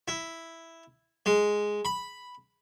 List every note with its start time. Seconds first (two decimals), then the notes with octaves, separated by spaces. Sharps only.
0.08 E4
1.26 G#3
1.85 B5